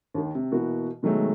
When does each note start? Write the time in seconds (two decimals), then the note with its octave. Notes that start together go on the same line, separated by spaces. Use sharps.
0.14 D#2 D#3
0.35 C3
0.52 B2 E3 A#3 F#4
1.03 B2 D#3 F#3 G#3 A3